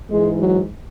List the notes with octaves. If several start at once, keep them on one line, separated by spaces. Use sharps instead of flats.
G#2 E3 G#3
F#3